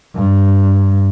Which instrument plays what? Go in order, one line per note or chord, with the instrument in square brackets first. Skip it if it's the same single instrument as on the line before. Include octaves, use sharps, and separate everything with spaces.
[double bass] G2